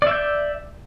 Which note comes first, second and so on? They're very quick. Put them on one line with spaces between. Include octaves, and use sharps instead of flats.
D5 E5 G6